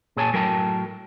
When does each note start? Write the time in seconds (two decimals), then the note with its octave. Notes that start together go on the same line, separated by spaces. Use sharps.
0.17 A#2 G#4 C#5 G#5 A5
0.33 A2 F#3 A#4 G5 A5